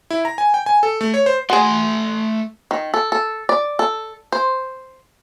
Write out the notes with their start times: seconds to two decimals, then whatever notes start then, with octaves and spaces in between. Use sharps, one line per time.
0.10 E4
0.25 A#5
0.38 G#5
0.54 G5
0.66 G#5
0.83 A4
1.01 A3
1.14 C#5
1.26 C5
1.50 A3 F#4 G#4 C6
2.71 D#3
2.94 A4
3.12 A4
3.49 D5
3.79 A4
4.32 C5